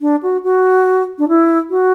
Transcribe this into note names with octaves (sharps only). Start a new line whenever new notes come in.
D4
F#4
F#4
D4
E4
F#4